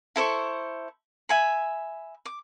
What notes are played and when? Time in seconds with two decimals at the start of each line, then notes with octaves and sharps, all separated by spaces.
0.16 E4 A4 C5 C#6
1.29 E5 G#5 B5
2.25 D6